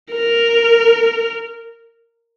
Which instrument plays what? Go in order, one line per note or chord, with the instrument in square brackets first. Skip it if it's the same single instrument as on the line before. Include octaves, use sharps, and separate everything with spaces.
[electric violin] A#4